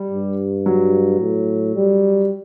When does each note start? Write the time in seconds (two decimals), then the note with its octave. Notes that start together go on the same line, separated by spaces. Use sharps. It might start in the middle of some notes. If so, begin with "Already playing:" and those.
Already playing: G3
0.11 G2
0.66 F#3
1.20 A2
1.75 G3